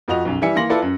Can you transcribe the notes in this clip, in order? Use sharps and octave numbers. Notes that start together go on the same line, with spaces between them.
F2 F3 F#4 D#5 F7
B1 F#2
E3 G3 E5 G#5 B6 C#7
E3 A#3 C6 A#6 F#7
E4 F4 A4 B4 D5
F#2